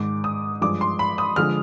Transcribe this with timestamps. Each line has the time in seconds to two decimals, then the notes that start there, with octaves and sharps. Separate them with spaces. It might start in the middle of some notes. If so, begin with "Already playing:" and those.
Already playing: G#2 D#3 G#3 D6
0.24 D#6
0.61 G2 F3 G#3 D6
0.81 C6
0.99 B5
1.18 D#6
1.36 D3 F3 G#3 F6